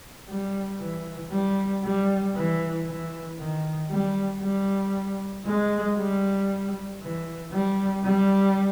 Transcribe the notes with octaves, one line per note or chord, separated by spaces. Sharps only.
G3
E3
G3
G3
E3
E3
D#3
G3
G3
G#3
G3
E3
G3
G3